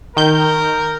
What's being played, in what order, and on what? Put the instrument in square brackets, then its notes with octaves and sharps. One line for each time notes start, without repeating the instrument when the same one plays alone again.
[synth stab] D#3 G6 [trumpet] A#4